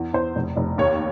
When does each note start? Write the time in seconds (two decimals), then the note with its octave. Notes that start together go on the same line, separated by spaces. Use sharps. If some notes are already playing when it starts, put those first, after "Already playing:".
Already playing: E2
0.13 E2 C5
0.36 F1
0.56 F1
0.78 D#2 C#5